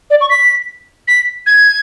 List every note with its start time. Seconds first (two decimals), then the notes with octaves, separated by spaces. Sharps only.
0.10 D5
0.21 C#6
0.30 B6
1.08 B6
1.46 G#6